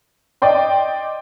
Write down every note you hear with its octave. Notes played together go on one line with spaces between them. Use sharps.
D5 D#5 G5 C6